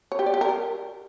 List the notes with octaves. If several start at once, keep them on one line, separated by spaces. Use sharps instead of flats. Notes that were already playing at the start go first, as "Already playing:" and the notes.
C#5
G4
D5
G4
A#4